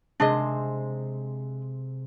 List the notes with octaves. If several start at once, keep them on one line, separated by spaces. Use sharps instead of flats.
C3 G#3 C4 D4 G#4 D#5